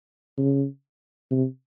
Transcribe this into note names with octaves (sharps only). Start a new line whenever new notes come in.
C#3
C3